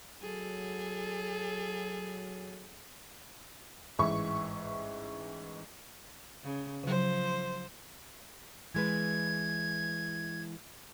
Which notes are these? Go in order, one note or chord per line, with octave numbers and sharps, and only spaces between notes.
F#3 G#4 A4
A1 G#2 E3 E5 C#6
C#3
C#3 F3 F#3 C5
E3 G#3 B4 G#6